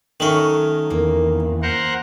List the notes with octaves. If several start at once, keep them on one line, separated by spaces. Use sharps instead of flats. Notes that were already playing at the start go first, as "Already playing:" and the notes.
D#3 F#3 A3 C#4 A#4
E2 A#3
A#4 C5 F#5